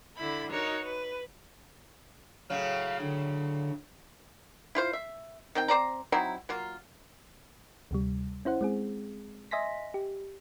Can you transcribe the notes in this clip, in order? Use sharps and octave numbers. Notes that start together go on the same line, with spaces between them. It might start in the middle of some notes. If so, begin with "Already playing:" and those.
D3 E4 B5
D#4 F#4 A#4 C#5
B4
A2 C#3 F#3 F5
D3
E4 F4 C5
E5
D#3 C4 G5
C4 C5 D5 A#5
F#3 C4 D#4 E4
F#3 A#3 F4
D2 C3 G3
C#4 E4 C5 F#5
G#3 C4 G#4
D#5 E5 G#5 C6 A#6 B6
G4